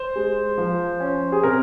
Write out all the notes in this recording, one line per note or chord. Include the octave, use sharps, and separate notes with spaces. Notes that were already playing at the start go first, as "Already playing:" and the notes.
Already playing: C5
G#3
F3
C#4
G#4
C3 A#4